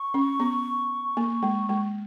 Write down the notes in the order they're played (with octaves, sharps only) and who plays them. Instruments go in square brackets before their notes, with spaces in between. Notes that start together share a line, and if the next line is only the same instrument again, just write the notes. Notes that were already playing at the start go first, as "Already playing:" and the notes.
Already playing: [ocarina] C#6
[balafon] C#4
B3
A#3
G#3
G#3